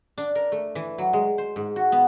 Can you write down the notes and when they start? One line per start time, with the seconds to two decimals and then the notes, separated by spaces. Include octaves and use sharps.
0.18 D4
0.35 A#4
0.52 A3
0.75 E3
0.98 F#3
1.13 G#3
1.38 C5
1.56 G#2
1.76 F#4
1.92 B3